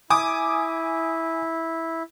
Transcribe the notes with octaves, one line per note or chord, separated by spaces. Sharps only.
E4 G#5 D6 D#6